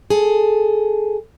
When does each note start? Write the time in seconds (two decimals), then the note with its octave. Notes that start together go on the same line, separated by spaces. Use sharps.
0.10 G#4 A4